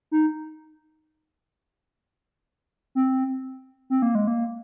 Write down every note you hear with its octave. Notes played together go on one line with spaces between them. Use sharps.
D#4
C4
C4
A#3
G#3
A#3